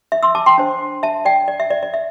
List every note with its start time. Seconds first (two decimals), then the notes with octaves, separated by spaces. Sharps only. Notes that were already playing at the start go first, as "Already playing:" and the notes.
0.12 E5
0.23 C6 E6
0.35 A5 D6
0.46 G5 C6
0.58 D4 C5
1.03 E5 A5
1.25 D5 G5
1.48 D5
1.60 E5
1.70 D5
1.83 D5
1.94 E5